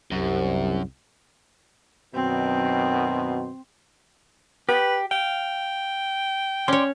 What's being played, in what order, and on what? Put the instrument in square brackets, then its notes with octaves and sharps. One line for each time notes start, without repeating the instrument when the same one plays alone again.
[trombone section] C2 [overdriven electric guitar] F#2
[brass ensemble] F#2 B2 D#3 [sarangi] C4
[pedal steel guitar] G4 [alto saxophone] B4
[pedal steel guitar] F5 [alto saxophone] G5
[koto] C#4 C#5 [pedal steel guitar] D5 C6